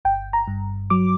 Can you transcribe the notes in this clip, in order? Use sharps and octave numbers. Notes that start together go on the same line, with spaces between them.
G1 G5
A#5
G2
F#3 D6